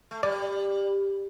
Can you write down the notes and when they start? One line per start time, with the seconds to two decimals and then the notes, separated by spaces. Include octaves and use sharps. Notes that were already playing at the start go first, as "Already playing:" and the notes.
0.11 A3
0.23 G3 D5